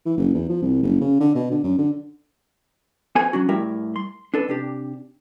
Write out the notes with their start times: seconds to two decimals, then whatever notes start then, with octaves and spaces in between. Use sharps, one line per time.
0.06 E3
0.17 F#1
0.34 E2
0.49 F3
0.62 C2
0.83 F#1
1.01 C#3
1.20 D3
1.35 B2
1.51 D3
1.64 F#2
1.78 D3
3.15 B3 F#4 A4 C5 F#5 G#5
3.33 F#3 C#4 D4 F#4
3.49 A2 G3 E4 A#4 E5
3.96 C6
4.34 D4 A4 B4
4.48 C3 D4 G4